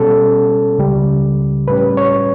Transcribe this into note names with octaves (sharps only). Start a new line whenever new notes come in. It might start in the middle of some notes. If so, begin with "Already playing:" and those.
Already playing: B2 G3 C#4 A4
C#2 C#3 G3
A2 G3 C#4 B4
C#5